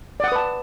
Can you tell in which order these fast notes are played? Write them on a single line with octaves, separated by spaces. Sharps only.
D5 F#5 D#6 B4 A5